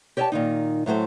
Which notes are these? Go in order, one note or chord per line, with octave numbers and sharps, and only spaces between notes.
G4 C#5 D#5 E5 G5 A5
A#2 D#3 D#4
A2 F#3 A3 C5